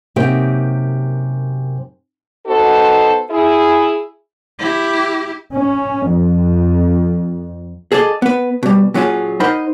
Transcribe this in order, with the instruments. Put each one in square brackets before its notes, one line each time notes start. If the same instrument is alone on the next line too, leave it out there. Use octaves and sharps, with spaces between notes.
[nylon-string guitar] F#2 C3 A#3 D#4 G4 G5
[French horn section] B3 D#4 F#4 A4 C5
E4 G#4
[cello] E4 G4
[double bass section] C#4
F2
[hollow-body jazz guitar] G#4 A4 D5 D#5
B3 B4
B2 G3
A#2 F#3 C#4 F4 G#4
D#4 A#4 C5 D#5 F#5 B5